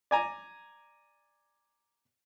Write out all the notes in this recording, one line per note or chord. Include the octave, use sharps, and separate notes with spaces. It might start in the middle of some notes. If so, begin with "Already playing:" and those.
D5 G#5 A#5